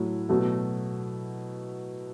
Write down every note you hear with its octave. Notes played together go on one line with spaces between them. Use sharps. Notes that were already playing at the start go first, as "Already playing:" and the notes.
Already playing: A2 F#3 A3 E4
B2 F#3 A3